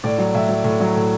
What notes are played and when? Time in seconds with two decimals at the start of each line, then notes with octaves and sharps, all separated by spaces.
0.04 A2 D5
0.18 F#3
0.34 A2 E5
0.49 F#3
0.64 A2
0.80 F#3
0.96 A2